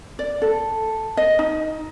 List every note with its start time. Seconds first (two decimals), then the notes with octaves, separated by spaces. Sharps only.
0.19 D5
0.42 A4
1.17 D#5
1.39 D#4